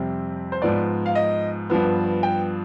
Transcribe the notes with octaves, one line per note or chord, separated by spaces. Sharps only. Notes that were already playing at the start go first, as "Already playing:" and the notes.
Already playing: F2 C3 G3 C4
C5
G#2 F3 B3 D5
F5
D#5
G2 F3 B3
G5